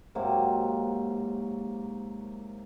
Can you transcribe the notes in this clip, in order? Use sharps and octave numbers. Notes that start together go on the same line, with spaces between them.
G#2 C3 F#3 A#3